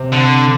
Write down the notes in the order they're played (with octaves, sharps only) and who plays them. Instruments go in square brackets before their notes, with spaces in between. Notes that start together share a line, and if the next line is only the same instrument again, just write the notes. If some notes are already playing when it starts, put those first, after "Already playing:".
Already playing: [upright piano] C3 C4
[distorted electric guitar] D3